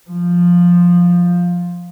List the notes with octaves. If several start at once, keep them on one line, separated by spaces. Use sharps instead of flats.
F3